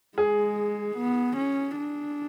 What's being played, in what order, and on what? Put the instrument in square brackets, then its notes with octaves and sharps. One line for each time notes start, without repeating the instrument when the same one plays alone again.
[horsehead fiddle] G#3 [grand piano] G#4
[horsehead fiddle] B3
C#4
D4